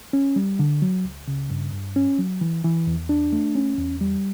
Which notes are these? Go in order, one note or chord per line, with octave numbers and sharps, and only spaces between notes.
C#4
G3
D3
F#3
C#2
C#3
G2
G2
C#4
F#3
E3
E3
E2
D4
A3
C#4
E2
G3